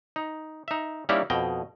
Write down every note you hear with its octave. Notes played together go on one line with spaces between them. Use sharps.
D#4
D#4 E5
G3 A#3 C#4 D#4 E4 G4
F2 B2 D#5 G5